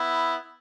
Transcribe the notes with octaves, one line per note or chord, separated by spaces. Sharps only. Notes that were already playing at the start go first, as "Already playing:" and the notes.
Already playing: B3 E4